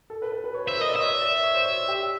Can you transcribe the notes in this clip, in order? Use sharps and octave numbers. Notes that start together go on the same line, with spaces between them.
A4
B4
B4
B4
C#5
C5 E5
A#4 D#5
D5
C#5 E5
D5
C#5
C5
C#5
G4